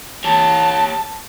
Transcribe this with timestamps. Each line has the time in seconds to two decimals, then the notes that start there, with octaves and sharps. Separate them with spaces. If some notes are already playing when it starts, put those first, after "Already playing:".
0.24 G4 C#5 A5